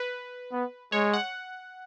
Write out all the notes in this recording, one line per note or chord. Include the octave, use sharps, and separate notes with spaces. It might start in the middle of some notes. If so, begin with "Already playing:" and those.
Already playing: B4
B3
G#3 C#5
F#5